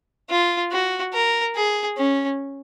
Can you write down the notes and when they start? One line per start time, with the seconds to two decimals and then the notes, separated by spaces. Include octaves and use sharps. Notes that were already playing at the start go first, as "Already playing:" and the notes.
0.30 F4
0.72 F#4
1.13 A#4
1.55 G#4
1.97 C#4